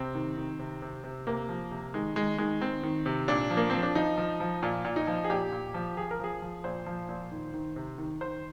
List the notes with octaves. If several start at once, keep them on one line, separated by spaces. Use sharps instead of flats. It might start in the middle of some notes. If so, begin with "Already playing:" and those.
Already playing: C3 C4
D#3
D#3
C3
C3
C3
C3 A#3
F3
C3
D#3 G#3
D#3 G#3
D#3 G#3
D#3 C4
D#3
C3
A#2 D4
F3
A#3
F3 C4
D4
F3 D#4
F3
F3
A#2 F4
A#2
D#4
F3
G#4
A#2 G4
A#2
F3
F3 G#4
A#4
F3 G#4
F3
A#2 C5
F3
A#2
D#3
D#3
C3
D#3
D#3 C5